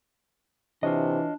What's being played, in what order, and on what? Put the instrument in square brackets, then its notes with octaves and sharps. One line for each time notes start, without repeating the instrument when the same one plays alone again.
[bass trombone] C3 [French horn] E3 [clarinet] D4 [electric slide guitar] F4 C#5 D#5